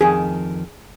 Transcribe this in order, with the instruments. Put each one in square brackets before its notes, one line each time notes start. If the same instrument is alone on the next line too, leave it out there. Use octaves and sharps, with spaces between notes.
[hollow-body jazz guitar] F2 D#3 [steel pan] G#4